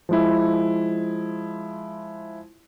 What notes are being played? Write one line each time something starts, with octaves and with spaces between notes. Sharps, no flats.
F3 G#3 E4